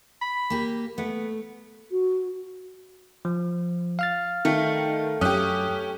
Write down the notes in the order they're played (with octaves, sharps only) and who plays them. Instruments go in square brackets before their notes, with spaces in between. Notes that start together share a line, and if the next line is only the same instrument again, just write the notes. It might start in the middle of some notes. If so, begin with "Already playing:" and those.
[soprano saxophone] B5
[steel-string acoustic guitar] A#3 G4
[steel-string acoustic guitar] A3 [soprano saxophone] B3
[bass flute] F#4
[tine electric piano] F3
F5 F6 A6
[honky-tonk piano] D#3 [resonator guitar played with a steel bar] A3
[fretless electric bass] F#2 [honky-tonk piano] C#4 G4 [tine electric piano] D#6 F#6